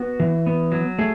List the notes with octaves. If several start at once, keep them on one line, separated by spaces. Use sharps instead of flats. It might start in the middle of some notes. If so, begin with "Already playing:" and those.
Already playing: B3 F#4
E3
B3
F#3
A3 G#4